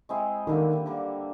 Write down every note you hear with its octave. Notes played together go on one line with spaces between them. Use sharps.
G#3 C4 E4 G#4
D3 D#3 G3 A#3
D3 G3 A#3